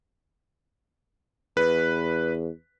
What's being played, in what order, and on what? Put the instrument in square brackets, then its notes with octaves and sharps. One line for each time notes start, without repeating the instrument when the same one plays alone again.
[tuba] E2 [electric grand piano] B4